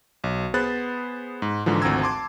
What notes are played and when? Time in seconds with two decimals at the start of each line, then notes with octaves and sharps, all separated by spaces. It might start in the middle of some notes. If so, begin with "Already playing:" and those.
0.24 B1
0.54 B3 G#4 C5 B5 F#6 A6
1.42 G#2
1.66 G#2 D3 E3 F3
1.82 G#1 D2 C4 A#5 E6 G#6
2.02 A5 C6 D6 G#6